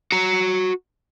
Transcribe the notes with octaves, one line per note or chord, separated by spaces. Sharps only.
F#4 A#5